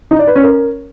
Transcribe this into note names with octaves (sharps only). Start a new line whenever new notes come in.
D#4
D5
B4
C#4
A#4